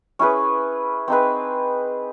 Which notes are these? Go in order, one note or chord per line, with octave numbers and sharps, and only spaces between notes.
C#4 E4 G#4 B4
C4 D#4 G#4 B4